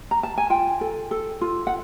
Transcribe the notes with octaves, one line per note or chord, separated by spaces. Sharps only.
A#5
A5
G#5
F4 G5
A4
A4
F4
F#5